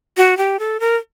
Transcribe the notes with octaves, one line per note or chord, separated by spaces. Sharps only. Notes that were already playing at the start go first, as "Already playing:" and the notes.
F#4
G4
A4
A#4